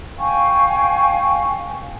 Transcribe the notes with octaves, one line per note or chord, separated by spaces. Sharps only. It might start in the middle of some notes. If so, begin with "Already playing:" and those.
F5 G5 G#5 C#6